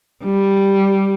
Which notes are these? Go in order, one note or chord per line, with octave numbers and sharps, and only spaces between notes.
G3